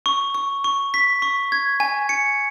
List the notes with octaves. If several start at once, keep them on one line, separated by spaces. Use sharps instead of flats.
C#6
C#6
C#6
B6
C#6
G#6
G#5
C#7